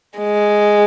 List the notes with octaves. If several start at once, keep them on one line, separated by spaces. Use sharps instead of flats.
G#3